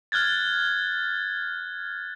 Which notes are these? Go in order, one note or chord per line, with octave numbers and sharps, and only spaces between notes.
F6 F#6 G#6 A6